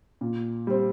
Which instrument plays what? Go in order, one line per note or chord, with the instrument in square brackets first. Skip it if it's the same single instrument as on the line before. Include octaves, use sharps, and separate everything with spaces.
[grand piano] A#2
G3 C4